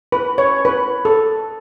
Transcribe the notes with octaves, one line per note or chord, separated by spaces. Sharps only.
B4
C#5
B4
A4